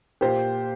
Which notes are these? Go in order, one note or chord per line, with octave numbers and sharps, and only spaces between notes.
A#2 G4 C5